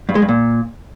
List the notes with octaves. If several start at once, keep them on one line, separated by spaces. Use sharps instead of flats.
G2
G#3
G2
A#2